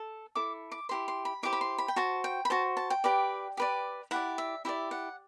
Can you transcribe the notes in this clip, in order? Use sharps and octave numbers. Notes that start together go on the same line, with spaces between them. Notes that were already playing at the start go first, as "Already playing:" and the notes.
Already playing: A4
E4 A4 D6
D6
E4 G4 C5 C6
C6
B5
E4 G4 C5 D6
B5
C6
B5
G5
F#4 C5 A5
G5
B5
F#4 C5 A5
A5
G5
G4 B4 D5
G4 B4 D5
E4 G4 D5 F#5
E5
E4 G4 D5 E5
F#5